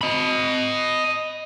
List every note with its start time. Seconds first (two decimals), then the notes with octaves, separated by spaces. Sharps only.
0.01 D#5 B5